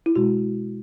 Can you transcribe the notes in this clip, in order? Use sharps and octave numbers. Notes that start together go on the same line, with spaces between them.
E4
B2 G#3 F#4